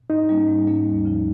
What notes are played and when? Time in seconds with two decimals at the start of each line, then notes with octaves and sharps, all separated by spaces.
0.10 G#2 D#4
0.29 G3 A#3 C#4
0.48 G#2
0.67 G3 A#3 C#4
0.86 D#2
1.05 C#3 F3